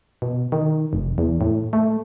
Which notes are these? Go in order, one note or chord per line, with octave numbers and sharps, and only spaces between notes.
B2
D#3
F1
E2
A2
A3